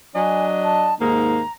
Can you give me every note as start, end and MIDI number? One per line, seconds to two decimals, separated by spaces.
0.15 0.93 54
0.15 0.93 62
0.15 0.93 75
0.15 0.44 80
0.63 0.94 81
1.00 1.41 39
1.00 1.41 44
1.00 1.41 58
1.00 1.52 82